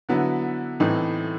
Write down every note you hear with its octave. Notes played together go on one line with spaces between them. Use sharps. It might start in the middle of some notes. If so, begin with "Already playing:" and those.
D3 F#3 B3 E4
A2 E3 A3 C4 D#4